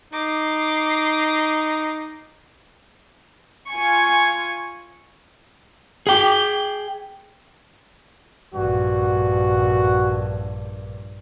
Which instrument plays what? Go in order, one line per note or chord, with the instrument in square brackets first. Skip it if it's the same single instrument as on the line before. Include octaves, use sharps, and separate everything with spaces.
[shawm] D#4 [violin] D6 C7
[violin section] F4 G#5 C#6
[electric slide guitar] G#4 G5
[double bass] A#1 G2 [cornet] F#4